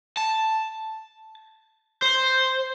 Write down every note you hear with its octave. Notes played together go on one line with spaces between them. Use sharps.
A5
C5